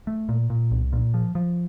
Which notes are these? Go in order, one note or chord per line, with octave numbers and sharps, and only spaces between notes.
A3
A#2
A#2
C2
A#2
F3
F3